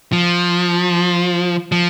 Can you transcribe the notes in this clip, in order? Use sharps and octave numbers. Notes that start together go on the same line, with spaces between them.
F3
F3